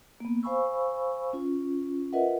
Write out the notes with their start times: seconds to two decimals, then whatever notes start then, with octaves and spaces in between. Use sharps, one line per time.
0.20 A#3 B3
0.43 C5 F5 G#5 B5 C#6 E6
1.33 C#4 F4
2.13 F4 A#4 B4 D#5 E5 F#5